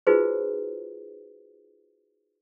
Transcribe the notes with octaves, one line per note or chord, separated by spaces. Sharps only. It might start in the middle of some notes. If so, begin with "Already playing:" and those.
D#4 F4 F#4 G#4 B4 C5